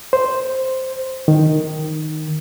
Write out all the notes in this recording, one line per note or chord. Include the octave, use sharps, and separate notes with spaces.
C5
D#3